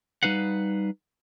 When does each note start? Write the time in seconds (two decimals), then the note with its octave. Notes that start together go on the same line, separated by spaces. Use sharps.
0.23 G3 D#4 B4 F5 F#5